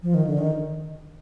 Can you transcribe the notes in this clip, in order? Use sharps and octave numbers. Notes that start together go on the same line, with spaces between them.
F3
D#3
D3
D#3